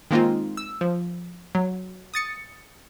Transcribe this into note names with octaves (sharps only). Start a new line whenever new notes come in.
D#3 G#3 A#3 C4 D#4 F4
E6
F3
F#3
D#6 A6 C#7